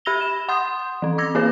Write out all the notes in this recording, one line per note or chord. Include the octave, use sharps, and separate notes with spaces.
G4 B5 E6 A#6 F7 G7
E7
F#5 C6 D#6 G6
E3 C4
D6 E6 G#6 A#6
A#3 E4 G#4 B4